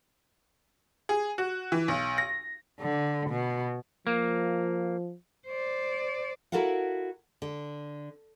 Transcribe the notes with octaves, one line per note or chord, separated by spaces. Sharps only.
G#4
F#4
E3
B1
A#6
D3
B2
F3 A#3
C5 D5
E4 F#4 A4 A#4 F5 F#5
D3